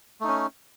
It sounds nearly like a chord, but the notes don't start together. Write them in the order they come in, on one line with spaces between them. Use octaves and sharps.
A3 D#4 C#4